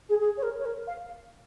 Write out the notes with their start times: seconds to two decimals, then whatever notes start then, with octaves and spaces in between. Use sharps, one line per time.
0.09 G#4
0.20 G#4
0.37 C#5
0.43 A#4
0.59 C#5
0.65 A#4
0.87 F5